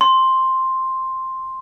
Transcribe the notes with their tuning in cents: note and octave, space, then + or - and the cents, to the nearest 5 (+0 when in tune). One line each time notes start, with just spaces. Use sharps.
C6 +5